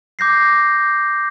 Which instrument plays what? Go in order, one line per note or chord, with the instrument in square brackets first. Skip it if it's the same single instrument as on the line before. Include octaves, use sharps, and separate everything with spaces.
[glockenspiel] D6 G6 A#6 C7